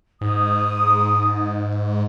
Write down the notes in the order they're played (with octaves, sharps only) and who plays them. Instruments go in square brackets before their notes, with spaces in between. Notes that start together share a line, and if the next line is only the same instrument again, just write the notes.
[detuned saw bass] G#2 [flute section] D#6